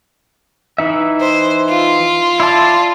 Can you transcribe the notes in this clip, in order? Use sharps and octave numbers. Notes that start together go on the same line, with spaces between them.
E3 D#4 E5
C5
F4
E4 D5 A5